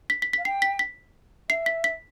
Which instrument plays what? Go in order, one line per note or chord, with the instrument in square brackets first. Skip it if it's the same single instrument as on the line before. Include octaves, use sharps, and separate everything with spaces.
[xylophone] B6
B6
B6
[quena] F5
[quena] G5 [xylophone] C7
[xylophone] B6
B6
[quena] E5 [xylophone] C7
[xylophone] B6
B6